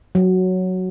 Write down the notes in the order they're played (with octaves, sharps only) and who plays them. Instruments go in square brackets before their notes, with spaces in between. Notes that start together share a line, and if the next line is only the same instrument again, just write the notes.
[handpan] F#3